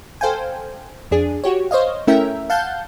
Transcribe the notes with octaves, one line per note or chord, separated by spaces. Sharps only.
A4 C5 F5 G5 G#5
F2 D4 G#4
F#4 G4 C#5
C5 C#5 D#5 F5
A3 C#4 E4 A#4 E5 G5
F5 F#5 A5 G6